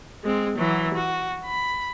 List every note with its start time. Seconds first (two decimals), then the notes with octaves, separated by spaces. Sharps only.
0.24 G#3 C4
0.58 E3 F#3
0.94 F#4
1.45 B5